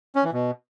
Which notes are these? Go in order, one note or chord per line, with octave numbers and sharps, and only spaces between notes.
C#4
E3
B2